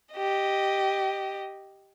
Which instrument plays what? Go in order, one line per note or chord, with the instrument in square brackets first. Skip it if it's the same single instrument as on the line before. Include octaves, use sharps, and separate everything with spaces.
[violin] G4 D#5